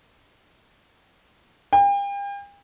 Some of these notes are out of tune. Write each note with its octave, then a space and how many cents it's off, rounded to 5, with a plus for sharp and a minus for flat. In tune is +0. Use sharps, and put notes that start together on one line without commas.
G5 +40